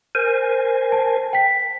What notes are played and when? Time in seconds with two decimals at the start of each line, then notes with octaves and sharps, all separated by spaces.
0.15 A#4 C5 G#5
0.92 A5
1.33 G5 B6